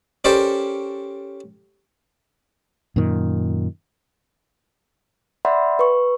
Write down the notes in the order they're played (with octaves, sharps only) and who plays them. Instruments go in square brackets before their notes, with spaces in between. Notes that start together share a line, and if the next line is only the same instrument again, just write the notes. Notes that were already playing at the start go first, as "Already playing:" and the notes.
[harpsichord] C#4 G4 A4 A#4 C5 D5
[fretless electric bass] F#2 A#2 D#3
[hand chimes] D5 E5 F#5 B5 C6
B4 C#6